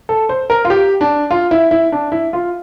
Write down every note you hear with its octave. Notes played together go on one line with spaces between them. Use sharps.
A4
C5
A#4
F4
G4
D4
F4
E4
E4
D4
E4
F4